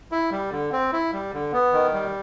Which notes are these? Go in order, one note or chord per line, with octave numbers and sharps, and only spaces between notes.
E4
G3
D3
C4
E4
G3
D3
B3
D#3
G3